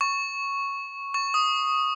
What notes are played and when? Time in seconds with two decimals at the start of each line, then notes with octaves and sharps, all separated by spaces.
0.01 C#6
1.14 C#6
1.34 D#6